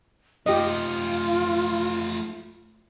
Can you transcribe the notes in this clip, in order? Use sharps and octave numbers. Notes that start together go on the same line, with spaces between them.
A3 D#4 F4 G4 D#5